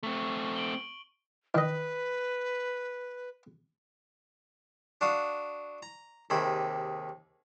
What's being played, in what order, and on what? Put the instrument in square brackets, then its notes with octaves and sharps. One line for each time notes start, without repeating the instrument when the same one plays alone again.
[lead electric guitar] A3 C4 [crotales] C#6
[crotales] D7 F#7 G7
[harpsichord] D#3 D#5 [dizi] B4
[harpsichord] D4 F#4 F5 D#6
A#5
D#2 C3 D#3 G#4 B5